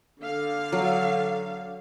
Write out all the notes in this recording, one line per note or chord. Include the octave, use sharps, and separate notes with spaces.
D3 F5
F#3